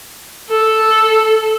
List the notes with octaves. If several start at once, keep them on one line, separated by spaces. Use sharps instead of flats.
A4